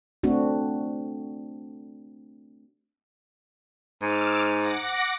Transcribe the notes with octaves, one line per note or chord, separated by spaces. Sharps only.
A3 C4 D4 F#4
G#2 D6 E6 F6
F#5 D6 A#6